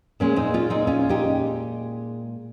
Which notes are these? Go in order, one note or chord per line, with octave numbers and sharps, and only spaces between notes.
A#2 G#3 A#3 C#4
C4 D#4
C#4 F4
C4 D#4
C#4 F4
D#4 G4